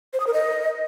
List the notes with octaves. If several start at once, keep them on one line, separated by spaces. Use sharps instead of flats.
C5
D#6
A#4
D#5